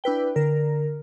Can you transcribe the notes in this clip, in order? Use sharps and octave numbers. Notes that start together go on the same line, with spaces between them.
D4 E4 B4 G5
D3 A#4